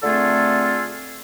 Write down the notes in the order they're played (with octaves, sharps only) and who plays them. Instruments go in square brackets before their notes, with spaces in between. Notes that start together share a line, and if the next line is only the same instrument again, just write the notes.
[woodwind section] D3 A3 C4 F4 G#4 A4